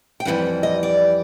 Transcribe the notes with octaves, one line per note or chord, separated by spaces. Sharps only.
G5
F2 C#3 E3 G3 F#5
D#5
D5